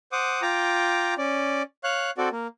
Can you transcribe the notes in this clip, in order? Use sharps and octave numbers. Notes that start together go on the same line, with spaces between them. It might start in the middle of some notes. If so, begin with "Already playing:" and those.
C5 F#5 D6 D#6
F4 G5 A#5 D6
C#4 D5
C#5 F5 F#6
C4 F#4 A4 D5
A#3